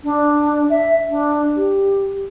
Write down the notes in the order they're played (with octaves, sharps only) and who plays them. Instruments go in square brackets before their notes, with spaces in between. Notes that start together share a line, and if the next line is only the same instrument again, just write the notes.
[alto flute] D4
E5
D4
G4